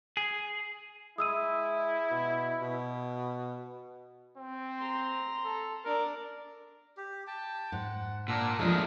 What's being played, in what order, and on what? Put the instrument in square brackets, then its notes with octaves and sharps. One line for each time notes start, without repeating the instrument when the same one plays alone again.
[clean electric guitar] G#4
[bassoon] G#3 [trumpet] E4 [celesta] D#6 E6 D#7
[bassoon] B2
B2
[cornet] C4
[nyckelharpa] A#5 C6
[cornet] A4
[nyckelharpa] D4 D5 [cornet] A#4
[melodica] G4
G5 A5
[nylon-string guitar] G#2 [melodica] F#5
[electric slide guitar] A#2 [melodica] D4 F#5 E6
[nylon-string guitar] E3 F3 [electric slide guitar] G#3 A3 D4 [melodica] D#4 A#4 D#5